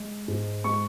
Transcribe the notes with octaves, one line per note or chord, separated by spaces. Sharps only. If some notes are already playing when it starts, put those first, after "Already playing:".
Already playing: G#3
G#2
G#3 C#6